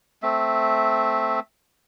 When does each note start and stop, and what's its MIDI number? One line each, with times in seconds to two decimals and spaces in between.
0.23 1.40 57
0.23 1.40 60
0.23 1.40 76